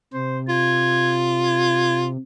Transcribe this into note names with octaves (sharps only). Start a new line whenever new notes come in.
C3 C5
F4 G#6
G#6